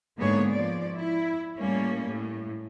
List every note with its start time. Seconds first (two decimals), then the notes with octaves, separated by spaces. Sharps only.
0.18 G#2 D3 A#3 B3 G#4 C#5
0.51 F3 D5
0.95 E4
1.58 A2 G3 A#3 C#4
2.06 A2